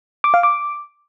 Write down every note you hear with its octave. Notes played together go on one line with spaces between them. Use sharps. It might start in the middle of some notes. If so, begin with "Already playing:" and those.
D6
F5
D6